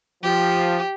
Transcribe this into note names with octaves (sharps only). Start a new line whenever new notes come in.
F3 G4